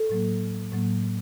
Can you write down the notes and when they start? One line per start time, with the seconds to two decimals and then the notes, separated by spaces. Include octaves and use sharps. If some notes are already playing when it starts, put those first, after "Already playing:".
Already playing: A4
0.09 A2 F#3 A#3
0.72 A2 F#3 A#3